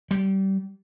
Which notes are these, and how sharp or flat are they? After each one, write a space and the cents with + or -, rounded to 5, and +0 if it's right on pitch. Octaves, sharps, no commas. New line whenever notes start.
G3 -25